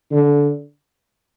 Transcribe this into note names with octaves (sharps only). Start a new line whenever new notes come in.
D3